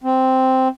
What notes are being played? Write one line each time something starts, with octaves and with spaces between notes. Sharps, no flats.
C4